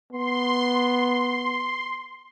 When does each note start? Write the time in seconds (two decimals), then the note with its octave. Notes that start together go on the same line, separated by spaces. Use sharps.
0.12 B3 C6